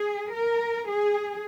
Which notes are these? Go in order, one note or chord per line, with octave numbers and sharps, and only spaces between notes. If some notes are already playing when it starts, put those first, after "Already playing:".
Already playing: G#4
A#4
G#4